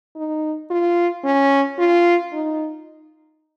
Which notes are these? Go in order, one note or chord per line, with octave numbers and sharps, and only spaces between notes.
D#4
F4
C#4
F4
D#4